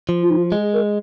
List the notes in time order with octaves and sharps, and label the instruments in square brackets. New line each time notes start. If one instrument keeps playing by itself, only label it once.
[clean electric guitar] F3
[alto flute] F4
D#4
F4
[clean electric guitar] G#3 [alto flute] G#4
[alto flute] A#4